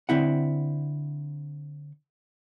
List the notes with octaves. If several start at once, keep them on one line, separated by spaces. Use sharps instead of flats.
D3 C4 E4 F#5